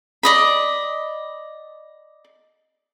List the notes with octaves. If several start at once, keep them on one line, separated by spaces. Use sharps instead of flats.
D5 D#5 B5